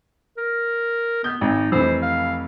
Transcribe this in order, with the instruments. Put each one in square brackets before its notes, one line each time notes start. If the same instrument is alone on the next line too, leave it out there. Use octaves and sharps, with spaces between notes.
[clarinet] A#4
[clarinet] B3 [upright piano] G6
[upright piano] G#1 [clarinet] D#4
[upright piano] F1 E3 [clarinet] C5
[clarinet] F5